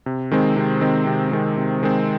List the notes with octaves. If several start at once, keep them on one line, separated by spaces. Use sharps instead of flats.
C3
D#3 G#3 C4
C3
D#3 G#3 C4
C3
D#3 G#3 C4
C3
D#3 G#3 C4